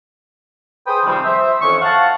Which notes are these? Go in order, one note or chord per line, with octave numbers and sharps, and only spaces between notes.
G#4 B4 C5 G5 D#6
C3 D#3 F3 G3 C4
C5 E5
F2 D#3 E3 C#4 C#6
F5 F#5 A5